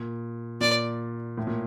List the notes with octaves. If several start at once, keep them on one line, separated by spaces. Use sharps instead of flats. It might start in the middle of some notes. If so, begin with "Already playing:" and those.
Already playing: A#2
A#2 D5
A2
A#2